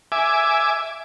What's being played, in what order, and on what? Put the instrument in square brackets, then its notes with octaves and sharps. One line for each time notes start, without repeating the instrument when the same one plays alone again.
[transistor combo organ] E5 G#5 D6